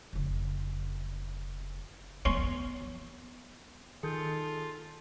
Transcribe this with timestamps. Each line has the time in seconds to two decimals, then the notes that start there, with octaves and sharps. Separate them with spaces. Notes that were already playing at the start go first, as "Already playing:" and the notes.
0.13 F1 C#3
2.25 B3 C#4 C6
4.03 D#3 F4 G#4 A4 G6